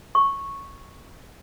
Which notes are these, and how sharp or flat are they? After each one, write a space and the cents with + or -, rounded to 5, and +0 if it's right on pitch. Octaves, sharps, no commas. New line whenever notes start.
C#6 -10